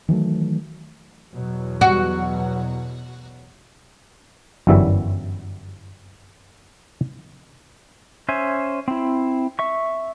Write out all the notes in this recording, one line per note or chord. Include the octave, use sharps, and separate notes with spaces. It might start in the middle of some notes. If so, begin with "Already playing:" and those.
D#3 E3 F#3 A3
E2 B2 F#3
F#4
G1 F#2 E3 F#3 G3 E5
C#4 C5 E5 G#5
C4 E4
E5 C#6